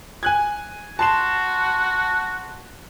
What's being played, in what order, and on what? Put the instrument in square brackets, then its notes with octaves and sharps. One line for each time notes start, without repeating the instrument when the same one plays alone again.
[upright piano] G#5 F#6 G#6
[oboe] F#4 [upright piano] A5 C6 E7